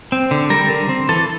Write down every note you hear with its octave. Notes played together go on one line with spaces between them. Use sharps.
C4
D3
G3 A#4
D3
C4
E3 A4